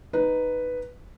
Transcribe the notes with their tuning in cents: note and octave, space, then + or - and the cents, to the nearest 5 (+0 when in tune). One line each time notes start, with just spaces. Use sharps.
D#4 +0 B4 +0